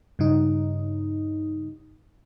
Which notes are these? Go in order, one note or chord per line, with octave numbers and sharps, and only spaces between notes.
G2 C#3 D#4